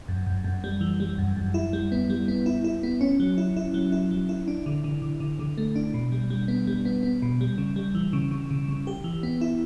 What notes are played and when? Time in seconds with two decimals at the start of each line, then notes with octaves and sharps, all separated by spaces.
0.08 F#2
0.27 F#2
0.44 F#2
0.64 G3
0.81 E3
1.00 G3
1.18 F#2
1.37 F#2
1.54 E4
1.73 G3
1.92 B3
2.10 G3
2.28 B3
2.46 E4
2.64 E4
2.83 B3
3.01 C#4
3.20 F#3
3.38 E4
3.57 E4
3.74 F#3
3.92 E4
4.11 F#3
4.29 E4
4.48 D4
4.66 D3
4.84 D3
5.02 D3
5.20 D3
5.39 D3
5.58 A3
5.76 D4
5.94 B2
6.12 G3
6.30 G3
6.48 B3
6.67 G3
6.85 B3
7.03 B3
7.22 B2
7.41 G3
7.58 C#3
7.76 G3
7.95 E3
8.13 C#3
8.31 C#3
8.51 C#3
8.69 C#3
8.87 G4
9.04 E3
9.23 B3
9.41 E4